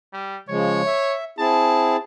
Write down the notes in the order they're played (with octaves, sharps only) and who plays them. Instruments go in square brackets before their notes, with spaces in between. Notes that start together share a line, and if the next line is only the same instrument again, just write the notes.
[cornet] G3
[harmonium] C#3 F3 G#3 [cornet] C#5
[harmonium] E5
[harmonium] C4 E4 G#4 [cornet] A5